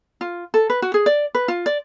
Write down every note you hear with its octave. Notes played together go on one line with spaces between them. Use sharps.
F4
A4
B4
F#4
G#4
D5
B4
F4
D5